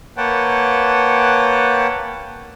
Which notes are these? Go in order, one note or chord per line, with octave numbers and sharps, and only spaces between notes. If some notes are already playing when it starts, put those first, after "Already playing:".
A#3 B4 C#5 F#5 G5 A5